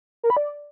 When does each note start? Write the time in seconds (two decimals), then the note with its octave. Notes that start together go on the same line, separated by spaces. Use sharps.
0.23 A#4
0.30 B5
0.37 D5